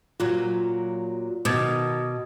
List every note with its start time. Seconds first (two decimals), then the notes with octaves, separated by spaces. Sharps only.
0.20 A#2 F#3 F4
1.45 B2 D#3 D6 D#6 G#6